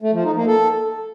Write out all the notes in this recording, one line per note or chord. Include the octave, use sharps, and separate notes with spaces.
A3
F3
D#4
A#3
A4